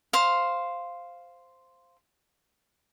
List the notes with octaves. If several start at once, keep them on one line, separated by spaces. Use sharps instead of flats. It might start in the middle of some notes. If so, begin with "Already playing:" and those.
C5 F5